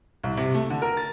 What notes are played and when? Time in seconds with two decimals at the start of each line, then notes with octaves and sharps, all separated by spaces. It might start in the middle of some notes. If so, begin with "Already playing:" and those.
0.23 C2
0.37 C3
0.54 A3
0.70 D3
0.82 A#4
0.97 A6